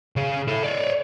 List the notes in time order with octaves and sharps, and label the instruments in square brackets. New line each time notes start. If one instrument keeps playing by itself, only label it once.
[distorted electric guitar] C#3 G#4
E4 A4
C#5 D5